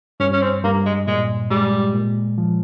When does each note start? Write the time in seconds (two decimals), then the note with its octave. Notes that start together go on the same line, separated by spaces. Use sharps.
0.20 G2 C#4
0.33 C#4
0.42 C4
0.64 G2 A#3
0.86 G#3
1.07 A#2 G#3
1.50 G3 G#3
1.94 A#2
2.38 F3